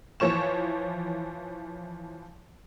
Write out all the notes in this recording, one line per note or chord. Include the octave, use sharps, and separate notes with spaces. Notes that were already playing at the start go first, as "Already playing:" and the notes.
E3 F3 C#5 C#6 E7